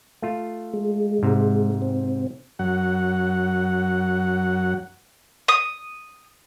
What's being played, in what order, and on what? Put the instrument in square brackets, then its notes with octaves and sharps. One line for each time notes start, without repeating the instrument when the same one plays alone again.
[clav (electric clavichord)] A3 F4
[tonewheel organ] G#3
[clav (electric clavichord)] G#2 C3
[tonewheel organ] C4
[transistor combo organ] F#2 F#3 F#5
[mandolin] D#6